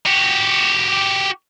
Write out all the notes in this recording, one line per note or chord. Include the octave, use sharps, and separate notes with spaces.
F#4 G4